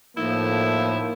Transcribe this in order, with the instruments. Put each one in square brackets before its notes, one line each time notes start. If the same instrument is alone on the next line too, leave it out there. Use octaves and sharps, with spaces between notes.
[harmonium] A2 F3 A3 [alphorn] A#3 [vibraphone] D#4 A#4 [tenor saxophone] E4